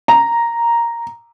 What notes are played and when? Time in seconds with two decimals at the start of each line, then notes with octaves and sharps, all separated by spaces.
0.08 A#5